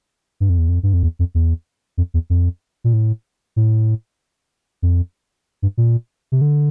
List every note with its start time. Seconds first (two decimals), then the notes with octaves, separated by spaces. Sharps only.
0.40 G2
0.49 F2
0.58 E2
0.68 F2
0.83 G2
0.93 F2
1.03 E2
1.19 F2
1.35 E2
1.98 F2
2.14 E2
2.30 F2
2.84 A#2
2.93 A2
3.56 A2
4.82 F2
5.62 G2
5.77 A#2
6.32 C3
6.41 D3